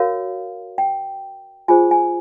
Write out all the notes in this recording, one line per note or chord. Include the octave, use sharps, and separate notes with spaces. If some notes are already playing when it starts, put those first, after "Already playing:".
Already playing: F#4 A#4 C#5 F5
G5
F4 G#4 C5 G#5
G#5